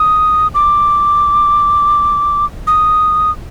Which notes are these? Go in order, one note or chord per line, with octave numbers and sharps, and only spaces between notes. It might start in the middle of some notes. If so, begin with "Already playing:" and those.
Already playing: D#6
D6
D#6